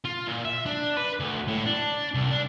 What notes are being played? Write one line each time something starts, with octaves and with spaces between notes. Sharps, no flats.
F4
A#2
E5
D4
B4
D2
A2
D4
C2
D4